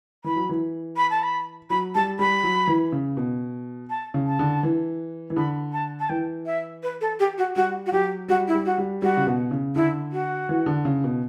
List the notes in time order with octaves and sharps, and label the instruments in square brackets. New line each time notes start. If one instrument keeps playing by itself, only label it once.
[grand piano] E3 [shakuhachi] B5
[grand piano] F#3
E3
[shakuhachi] B5
A5
B5
[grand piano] F#3 [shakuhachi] B5
[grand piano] G3 [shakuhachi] A5
[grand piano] G3 [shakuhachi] B5
[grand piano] F#3
E3
C#3
B2
[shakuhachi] A5
[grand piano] C#3
[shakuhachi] A5
[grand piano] D3
E3
E3
[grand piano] D3 [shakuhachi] B5
[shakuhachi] A5
A5
[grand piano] E3 [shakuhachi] G5
[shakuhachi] E5
B4
A4
G4
F#4
[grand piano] G3 [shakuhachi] F#4
[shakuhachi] F#4
[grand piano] F#3 [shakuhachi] G4
[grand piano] G3 [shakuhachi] F#4
[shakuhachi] E4
[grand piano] G3
[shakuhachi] F#4
[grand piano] G3
[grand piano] G3 [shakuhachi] F#4
[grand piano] C#3
B2
C#3
[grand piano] D3 [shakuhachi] E4
[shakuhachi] F#4
[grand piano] E3
D3
C#3
B2